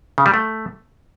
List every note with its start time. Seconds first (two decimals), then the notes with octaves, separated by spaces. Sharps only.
0.18 C#3
0.26 G3
0.34 A3